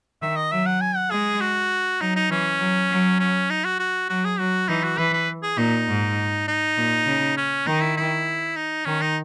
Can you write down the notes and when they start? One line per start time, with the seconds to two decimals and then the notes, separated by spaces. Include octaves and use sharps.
0.22 D#3 E5
0.36 D#5
0.51 F#3 E5
0.66 F#5
0.81 G#5
0.96 F#5
1.11 G#3 G#4
1.40 F#4
2.01 F#3 D#4
2.16 D#4
2.30 E3 C#4
2.60 F#3
2.90 F#3
3.19 C#4
3.50 D#4
3.64 F#4
3.79 F#4
4.09 F#3 F#4
4.25 G#4
4.39 F#3 F#4
4.69 E3 D#4
4.83 F#4
4.98 E3 B4
5.14 B4
5.43 G#4
5.58 A#2 D#4
5.88 G#2
6.48 D#4
6.77 A#2
7.06 C#3
7.37 C#4
7.66 D#3 D#4
7.81 E4
7.97 E4
8.56 D#4
8.85 D#3 C#4
9.01 D#4